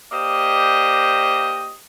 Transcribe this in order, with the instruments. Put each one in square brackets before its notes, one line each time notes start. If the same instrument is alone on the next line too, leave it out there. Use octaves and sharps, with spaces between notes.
[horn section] A#3 G4 C5 D5 D#5